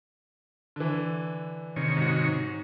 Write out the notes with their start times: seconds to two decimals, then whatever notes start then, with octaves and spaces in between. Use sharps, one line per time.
0.76 D3 E3
1.76 C3 D#3 C#5
1.97 G#2 F#4